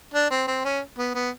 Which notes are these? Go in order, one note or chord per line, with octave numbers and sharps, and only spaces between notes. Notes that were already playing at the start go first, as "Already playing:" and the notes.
D4
C4
C4
C#4
B3
B3